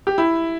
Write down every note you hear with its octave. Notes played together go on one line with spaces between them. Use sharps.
G4
E4